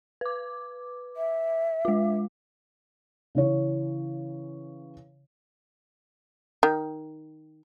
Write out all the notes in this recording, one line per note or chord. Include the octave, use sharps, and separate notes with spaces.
B4 D6
E5
G#3 F4
C#3 E3 C#5
D#3